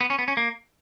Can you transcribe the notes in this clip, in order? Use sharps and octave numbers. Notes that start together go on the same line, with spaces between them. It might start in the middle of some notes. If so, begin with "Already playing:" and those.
B3
C#4
B3
C#4
A#3